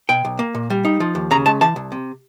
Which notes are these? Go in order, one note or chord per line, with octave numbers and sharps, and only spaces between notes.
B2 G5
B1
A#3
A#2
G3
D#4
F3
D#2
C#3 A#5
G#3 A5
E3 A5
C2
C3